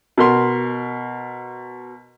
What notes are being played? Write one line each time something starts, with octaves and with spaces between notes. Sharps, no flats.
B2 A#4 C6